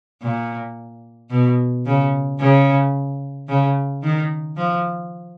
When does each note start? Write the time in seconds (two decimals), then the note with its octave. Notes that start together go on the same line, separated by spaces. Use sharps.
0.22 A#2
1.30 B2
1.86 C#3
2.39 C#3
3.48 C#3
4.03 D#3
4.57 F3